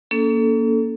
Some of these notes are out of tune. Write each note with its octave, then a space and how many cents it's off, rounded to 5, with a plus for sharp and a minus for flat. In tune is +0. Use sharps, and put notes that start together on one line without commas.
A#3 +0 C#4 +45 A4 +0